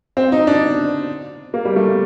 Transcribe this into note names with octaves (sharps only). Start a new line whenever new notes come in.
C4
D#4
D4
A#3
G3
A3